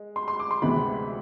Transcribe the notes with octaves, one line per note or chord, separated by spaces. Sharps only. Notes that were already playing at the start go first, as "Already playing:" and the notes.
Already playing: G#3
C6
C6
D6
C6
D2 C3 E3 G#3 B3 B5